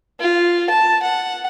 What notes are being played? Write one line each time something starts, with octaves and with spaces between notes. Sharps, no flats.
F4
A5
F#5